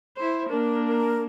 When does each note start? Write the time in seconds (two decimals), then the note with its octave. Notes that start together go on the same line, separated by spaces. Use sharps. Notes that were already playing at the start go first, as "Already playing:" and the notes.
0.17 E4 C5
0.49 A#3 D4 A#4
0.87 A#4